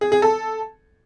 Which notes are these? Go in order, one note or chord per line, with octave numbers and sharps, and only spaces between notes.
G#4
G#4
A4